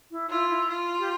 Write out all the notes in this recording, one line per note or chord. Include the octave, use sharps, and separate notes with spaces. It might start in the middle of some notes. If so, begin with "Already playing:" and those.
E4
E4 F4
E4
F4
G4